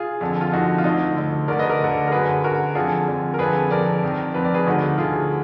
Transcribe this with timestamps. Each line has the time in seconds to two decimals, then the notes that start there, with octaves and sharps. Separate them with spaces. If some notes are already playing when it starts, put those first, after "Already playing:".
Already playing: F4 G#4
0.21 F2 D3
0.41 F4
0.52 F2 D3 D#4 F#4
0.78 F4
0.84 D2 D3 D#4
1.16 D2 D3
1.48 D2 D3 A#4 D5
1.59 B4 D#5
1.70 A#4 D5
1.80 D2 D3
2.08 A#4
2.11 F#2 D3 G#4 B4
2.44 F#2 D3 F#4 A#4
2.75 F2 D3 F4 G#4
3.08 F2 D3
3.34 A#4
3.39 F2 D3 G#4 B4
3.71 F2 D3 A#4 D5
4.03 F2 D#3
4.34 F2 D#3 B4
4.44 D5
4.54 G#4 B4
4.66 D2 D3 D#4 F#4
4.98 D2 D3 F4 G#4